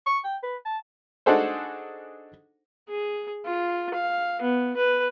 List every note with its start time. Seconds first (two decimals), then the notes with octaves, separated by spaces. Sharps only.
0.06 C#6
0.24 G5
0.43 B4
0.65 A5
1.26 D4 D#4 F#4 G#4 A4 C5
2.88 G#4
3.45 F4
3.94 F5
4.42 B3
4.77 B4